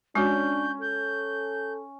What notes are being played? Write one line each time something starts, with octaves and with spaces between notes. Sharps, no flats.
G#3 C#4 D4 F#4 G6
A4 G6